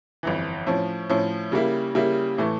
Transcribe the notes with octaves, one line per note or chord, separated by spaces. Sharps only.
G1 F2 E3
A2 F3 C#4
A2 F3 C#4
C#3 G3 A#3 E4
C#3 G3 A#3 E4
A2 E3 A3